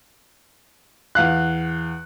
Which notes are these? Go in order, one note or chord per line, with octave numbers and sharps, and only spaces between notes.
E2 F5 F#6